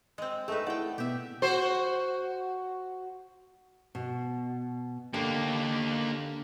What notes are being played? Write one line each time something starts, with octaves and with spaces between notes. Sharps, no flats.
G#3 C4
A3 D#4 G#4 A4 B4
E4 D5 F#5 G5
B2 B3 G4 E5
F#4 C5
B2
D3 A#3 G4